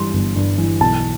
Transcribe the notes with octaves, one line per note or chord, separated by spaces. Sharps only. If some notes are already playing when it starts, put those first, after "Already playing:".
Already playing: G2 E3 G3 C6
G1
G2
E3
B1 A5